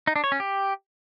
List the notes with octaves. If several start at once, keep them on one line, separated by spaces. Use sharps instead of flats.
D#4
D4
C#5
C#4
G4